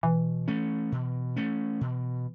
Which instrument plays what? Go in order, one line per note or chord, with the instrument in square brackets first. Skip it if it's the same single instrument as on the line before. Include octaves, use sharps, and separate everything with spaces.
[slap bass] B2 [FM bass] E3
[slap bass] A3 C#4
B2
A3 C#4
B2